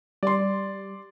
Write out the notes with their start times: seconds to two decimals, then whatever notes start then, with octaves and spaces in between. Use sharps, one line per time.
0.23 G3 D5 C6